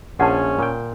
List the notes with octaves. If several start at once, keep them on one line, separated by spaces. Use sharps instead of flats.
A#1 F3 C#4 F#5 G#5 A5
A#2 G5